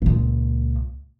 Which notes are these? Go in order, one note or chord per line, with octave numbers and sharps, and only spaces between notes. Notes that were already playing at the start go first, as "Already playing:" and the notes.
C#2 A#2